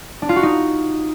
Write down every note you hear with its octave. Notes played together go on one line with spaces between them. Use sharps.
D4
F4
F#4
D#4